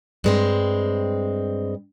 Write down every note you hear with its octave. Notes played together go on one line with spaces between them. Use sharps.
G2 G#3 C4